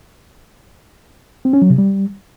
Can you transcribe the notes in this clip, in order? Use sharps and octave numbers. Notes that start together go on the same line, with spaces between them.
C4
C#4
F#3
C3
G3